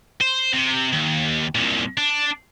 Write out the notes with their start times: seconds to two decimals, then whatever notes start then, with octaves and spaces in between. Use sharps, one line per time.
0.21 C5
0.54 C3
0.93 D#2
1.55 C2 A#2
1.98 D4